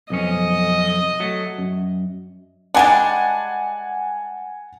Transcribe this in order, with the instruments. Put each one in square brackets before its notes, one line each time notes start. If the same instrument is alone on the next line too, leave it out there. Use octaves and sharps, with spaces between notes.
[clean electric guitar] B1 F2 C#4 [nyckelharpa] D#5
[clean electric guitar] F#3 A3
F#2
[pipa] G3 G#3 D4 [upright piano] F#5 G#5 A5